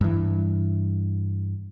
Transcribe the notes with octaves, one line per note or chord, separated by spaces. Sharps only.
G2 E3